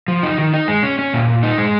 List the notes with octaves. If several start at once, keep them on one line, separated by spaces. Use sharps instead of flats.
F3
D#4
D#3
D#4
G#3
C#4
C#4
A#2
A#2
D#4
G#3